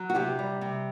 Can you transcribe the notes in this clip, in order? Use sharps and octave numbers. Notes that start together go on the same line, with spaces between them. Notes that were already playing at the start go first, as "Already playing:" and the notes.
Already playing: F#3
F#4
C3 G4
G3
C3